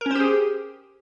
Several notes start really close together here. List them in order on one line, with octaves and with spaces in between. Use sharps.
A#4 C#4 C5 G4 G#4